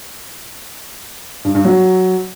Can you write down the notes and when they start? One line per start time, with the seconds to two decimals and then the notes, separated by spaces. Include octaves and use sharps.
1.45 G2
1.55 G2
1.65 F#3